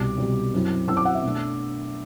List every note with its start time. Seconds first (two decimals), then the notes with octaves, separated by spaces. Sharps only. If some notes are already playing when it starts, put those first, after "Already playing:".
Already playing: C2 B2 G3 D6
0.18 C2 B2 G3
0.54 F#2 F#3 C4 E4
0.88 F#2 F#3 C4 E4 E6
0.97 D6
1.05 F#5
1.15 E5
1.23 B2 A3 D4